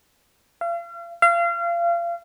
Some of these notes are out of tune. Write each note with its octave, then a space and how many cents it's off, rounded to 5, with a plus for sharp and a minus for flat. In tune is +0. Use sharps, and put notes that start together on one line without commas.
F5 -40
F5 -30